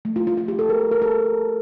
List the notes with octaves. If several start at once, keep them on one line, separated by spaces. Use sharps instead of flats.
A3
F4
F4
F4
G4
A4
A#4
A#4
A4